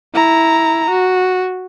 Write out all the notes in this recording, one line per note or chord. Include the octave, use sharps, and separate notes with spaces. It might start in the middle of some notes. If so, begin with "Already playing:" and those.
E4 A#5
F#4